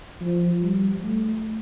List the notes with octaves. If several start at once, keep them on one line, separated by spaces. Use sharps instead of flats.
F3
G3
A3